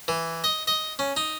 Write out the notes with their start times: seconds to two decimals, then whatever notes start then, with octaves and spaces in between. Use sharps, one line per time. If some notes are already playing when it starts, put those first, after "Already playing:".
0.08 E3
0.44 D#5
0.67 D#5
0.99 C#4
1.17 D#4